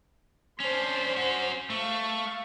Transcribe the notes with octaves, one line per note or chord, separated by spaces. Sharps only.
C#4 D4 C5 C6
C#4 F#4
A3 F5 C#6